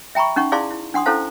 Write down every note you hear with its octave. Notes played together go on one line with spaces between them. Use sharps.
E5 G5 A#5 B5 C#6
C#4 D#4 F#5 C#6
E4 G#4 D5 F5 A5 C6
E4
D4 F#5 C6 D#6
C#4 E4 A4 C5 F5 A5